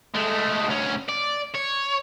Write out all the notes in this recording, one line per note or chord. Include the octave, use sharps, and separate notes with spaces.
G#3 A3
D2 C#4
D5
C#5